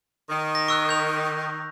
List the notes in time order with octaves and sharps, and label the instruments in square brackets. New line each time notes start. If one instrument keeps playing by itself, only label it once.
[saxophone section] D#3
[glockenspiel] A#6
C#6 E6 F#6
G6 F7